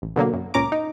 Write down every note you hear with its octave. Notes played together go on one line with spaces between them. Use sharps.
A1
B2 D3 F#3 A#3
F#2
C#2 A#2 C#4 A#5 D6
D#4